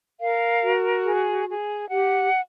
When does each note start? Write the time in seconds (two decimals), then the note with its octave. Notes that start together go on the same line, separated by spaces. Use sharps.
0.20 A#4 F5
0.63 F#4
1.05 G#4
1.48 G#4
1.90 G4 F#5